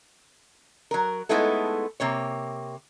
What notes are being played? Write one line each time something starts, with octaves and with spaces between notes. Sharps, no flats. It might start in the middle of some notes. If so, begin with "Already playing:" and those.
F#3 A#4
G#3 A3 B3 D#4 E4 A4
C3 A#3 C#5